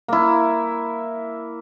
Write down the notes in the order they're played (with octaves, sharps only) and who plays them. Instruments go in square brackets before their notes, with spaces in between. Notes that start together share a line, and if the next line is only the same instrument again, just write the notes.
[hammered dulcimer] A#3 E4